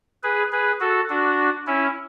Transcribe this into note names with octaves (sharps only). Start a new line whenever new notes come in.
G#4 B4
G#4 B4
F#4 A4
D4 F#4
C#4 E4